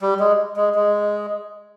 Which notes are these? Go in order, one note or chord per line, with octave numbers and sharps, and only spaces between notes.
G3
G#3
G#3
G#3